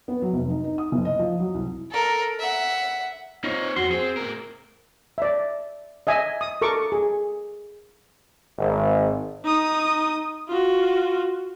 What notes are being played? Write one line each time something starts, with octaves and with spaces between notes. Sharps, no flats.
B3
F#3
F1
D#4
D#4
D#6
F#1
D#5
F3
F#3
C2
A4 A#4
E5 F#5
C4 D#4 F4 C#5
F2 F#4 C6
C4 G#4
A2 A#4
D5 E5
D#5 E5 G#5
D#6
A4 A#4 C#6 D6
G#4
G#1
D#4 D#6
F4 F#4